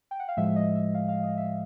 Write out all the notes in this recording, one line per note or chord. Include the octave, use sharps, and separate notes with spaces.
G5
F#5
F5
A2 F3 G#3 E5
D#5
E5
F5
F5
D#5
E5